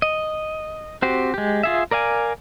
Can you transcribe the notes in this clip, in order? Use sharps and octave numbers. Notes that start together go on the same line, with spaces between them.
D#5
C4 F#4 G4 C5
G#3 G4
F4 G#4 E5
A#4 D5 F5 G#5